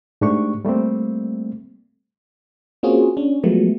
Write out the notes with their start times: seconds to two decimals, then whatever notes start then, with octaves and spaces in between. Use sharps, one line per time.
0.21 G#2 A3 D4 G4 C#6
0.65 G3 A3 A#3 C4
2.83 A#3 C4 C#4 F4 F#4 G#4
3.17 C#4 D4
3.43 F3 F#3 G#3 A3 B3